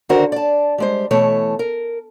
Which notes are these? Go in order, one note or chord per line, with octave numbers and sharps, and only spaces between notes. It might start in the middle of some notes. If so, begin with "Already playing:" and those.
D3 D#3 D4 F#4 A#4 C5
D5 A5
G3 G#3 C5
B2 E3 A3 C#5 A5
A#4